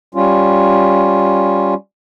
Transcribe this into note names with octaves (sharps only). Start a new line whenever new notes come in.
G3 C#4 F4